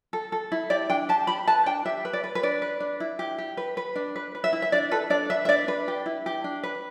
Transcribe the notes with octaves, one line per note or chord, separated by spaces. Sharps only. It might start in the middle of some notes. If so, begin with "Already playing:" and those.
A4
A4
E4
G4 D5
D4 G5
G4 A5
G4 B5
B4 A5
D4 G5
G4 E5
B4
D5
B4
B4
D4 D5
B4
D4
E4
G4
G4
B4
B4
D4
B4
B4
E5
E4
E5
D4 D5
A4 B4
D4 D5
B4 E5
E5
D4 D5
D4 B4
G4
E4
G4
D4
B4